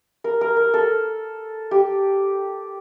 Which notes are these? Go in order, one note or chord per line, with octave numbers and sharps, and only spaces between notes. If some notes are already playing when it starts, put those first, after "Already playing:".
A#4
A#4
A#4
A4
G4